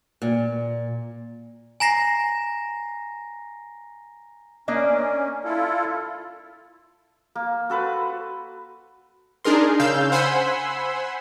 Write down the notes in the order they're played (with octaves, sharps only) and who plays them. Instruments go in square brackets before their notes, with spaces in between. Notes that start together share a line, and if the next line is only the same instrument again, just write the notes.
[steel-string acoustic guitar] A#2
[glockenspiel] G#5 A#5 A#6 C7
[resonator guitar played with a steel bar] A#3 D4 D#5 [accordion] C#4
[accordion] E4 F4 A4
[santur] A#3
F#4 A4 B4 C5
[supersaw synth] D4 D#4 G#4 A#4 C6
C#3 F5 E6 G6
C5 F#5 G#5 B5 C6 E6